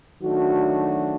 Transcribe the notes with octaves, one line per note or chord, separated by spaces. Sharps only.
D#3 F#3 A3 D4 F#4